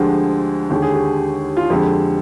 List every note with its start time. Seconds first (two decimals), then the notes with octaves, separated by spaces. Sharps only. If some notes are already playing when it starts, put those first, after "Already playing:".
Already playing: D2 D3 F3 G#3 G4
0.70 D#2 D3 G#3 G4
0.82 G#4
0.94 G4
1.57 F4
1.70 F2 D3 G#3 G4